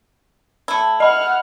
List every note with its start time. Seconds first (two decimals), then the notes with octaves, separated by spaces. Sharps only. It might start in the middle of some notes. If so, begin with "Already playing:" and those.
0.68 A3 E4
1.00 D#5 F#5 B5 F6